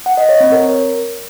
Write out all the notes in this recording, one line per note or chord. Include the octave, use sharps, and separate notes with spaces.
F#5
D#5
C#5
C4
A#4